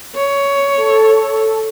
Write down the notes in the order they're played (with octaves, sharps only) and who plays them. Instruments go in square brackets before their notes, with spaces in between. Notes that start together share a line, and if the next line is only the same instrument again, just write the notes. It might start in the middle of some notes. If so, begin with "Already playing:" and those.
[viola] C#5
[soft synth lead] A4